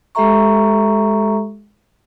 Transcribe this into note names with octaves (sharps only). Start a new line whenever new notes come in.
G#3 G4 A4 E5 A#5 C#6